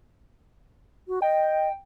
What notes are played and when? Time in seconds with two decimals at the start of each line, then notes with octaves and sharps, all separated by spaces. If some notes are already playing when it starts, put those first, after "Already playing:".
1.08 F#4
1.22 D#5 G5